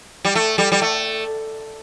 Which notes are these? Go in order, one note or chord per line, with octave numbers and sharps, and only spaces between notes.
G3
A3
G3
G3
A3